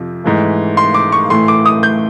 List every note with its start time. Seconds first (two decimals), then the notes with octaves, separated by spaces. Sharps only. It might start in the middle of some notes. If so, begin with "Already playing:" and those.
Already playing: F2 C3 F3
0.24 G#2 E3 A3
0.77 C6
0.94 D6
1.12 C#6
1.30 A2 E3 A3 C6
1.48 D6
1.66 D#6
1.83 G6